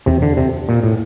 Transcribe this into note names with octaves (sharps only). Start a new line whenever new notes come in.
E2 C3
D3
C3
A#2
A2